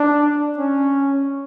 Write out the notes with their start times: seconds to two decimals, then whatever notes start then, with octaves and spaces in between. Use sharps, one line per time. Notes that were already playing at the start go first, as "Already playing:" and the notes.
Already playing: D4
0.58 C#4